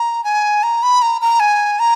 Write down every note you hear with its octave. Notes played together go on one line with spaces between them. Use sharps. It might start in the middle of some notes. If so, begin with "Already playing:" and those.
Already playing: A#5
G#5
A#5
B5
A#5
A#5
G#5
A#5